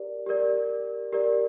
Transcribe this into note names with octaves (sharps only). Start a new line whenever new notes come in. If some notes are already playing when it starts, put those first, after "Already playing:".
Already playing: G4 A#4 D5
G4 A#4 D5
G4 A#4 D5